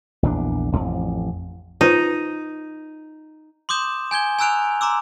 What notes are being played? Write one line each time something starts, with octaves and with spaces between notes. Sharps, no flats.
A#1 E2 F3 D4
E1 A1 F2
D#4 F4 B4 C5
C6 D6 D#6 G6 E7
G#5 G6 G#6 G7
G#5 A#5 E6 F#6 D7 F7
A#5 C6 D6 E6